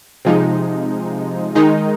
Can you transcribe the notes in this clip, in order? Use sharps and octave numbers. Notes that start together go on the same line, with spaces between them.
C3 F3 G#3 D#4
D#3 G#3 D#4